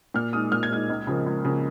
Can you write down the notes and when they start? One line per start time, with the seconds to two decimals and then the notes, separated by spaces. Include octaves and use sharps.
0.14 A#2 F6
0.33 G#3 D#4 D#6
0.52 A#2 F6
0.63 G#6
0.70 G#3 D#4 F6
0.89 C#2
1.07 C#3 F3 A#3
1.26 C#2
1.45 C#3 F3 A#3